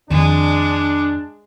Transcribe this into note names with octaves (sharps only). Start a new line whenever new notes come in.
F2 D#3 G#3 D4